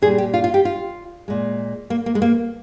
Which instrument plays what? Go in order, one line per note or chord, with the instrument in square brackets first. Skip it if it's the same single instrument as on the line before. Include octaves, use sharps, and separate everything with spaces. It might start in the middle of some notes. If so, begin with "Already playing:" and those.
[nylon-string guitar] A#2 G#4
G3
G4
F4
F4
G4
F4
A#2 G#3
A#3
A#3
G#3
A#3